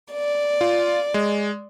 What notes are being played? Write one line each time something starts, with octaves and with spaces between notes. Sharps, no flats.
D5
F4
G#3